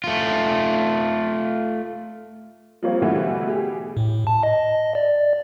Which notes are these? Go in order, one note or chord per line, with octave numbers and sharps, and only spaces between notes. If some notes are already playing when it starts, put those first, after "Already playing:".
A3 F4
F3 G3 A#3 C4 C#5 F5
B2 D3 E3 G3 A3
G4 G#4
A2
A5
D#5
D5